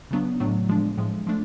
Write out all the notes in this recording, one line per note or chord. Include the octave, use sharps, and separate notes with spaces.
C#3 F#3 B3 D4
A2 F#3 A3 D4
F3 G#3 D4
A2 F3 G#3
F3 A3 D4